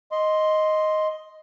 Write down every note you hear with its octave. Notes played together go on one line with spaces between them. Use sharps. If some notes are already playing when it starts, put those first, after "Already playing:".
D#5 C6